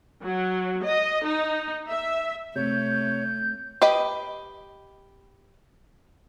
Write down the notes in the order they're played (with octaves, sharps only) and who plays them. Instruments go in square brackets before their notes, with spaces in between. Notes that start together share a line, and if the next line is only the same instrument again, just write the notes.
[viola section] F#3
D#5
D#4
E5
[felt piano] C3 [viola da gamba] A3 [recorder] C#5 [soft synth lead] G6
[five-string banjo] G4 B4 D#5 B5